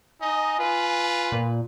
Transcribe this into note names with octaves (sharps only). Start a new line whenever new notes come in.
D#4 D#5 G#5
F4 B4
A#2